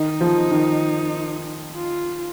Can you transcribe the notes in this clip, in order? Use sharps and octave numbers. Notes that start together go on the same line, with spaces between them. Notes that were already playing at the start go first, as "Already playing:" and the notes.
Already playing: D#3 D#4
F3
D#3
F4